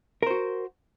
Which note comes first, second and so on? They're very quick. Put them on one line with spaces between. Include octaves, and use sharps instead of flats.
A#4 C5 F#4